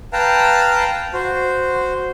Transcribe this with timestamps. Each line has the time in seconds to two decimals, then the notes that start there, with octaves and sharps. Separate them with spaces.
0.13 B4 F5 G5 A5 A#5
1.14 F#4 C5